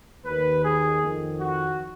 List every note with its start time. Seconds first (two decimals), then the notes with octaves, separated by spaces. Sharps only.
0.25 D#2 D#3 B4
0.63 G#4
1.01 F2 D#3
1.39 F#4